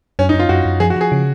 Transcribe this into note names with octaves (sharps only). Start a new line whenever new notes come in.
F#2 C#4
D#4
F#2
F4
F#2 F#4
F#2
F3 G#4
F#4
F3 G#4
C#3